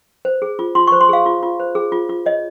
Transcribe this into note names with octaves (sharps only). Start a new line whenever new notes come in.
C5
G#4
F4
F4 C6
C5 C#6
C6
G#4 F5
F4
F4
C5
G#4
F4
F4
C#5 D#5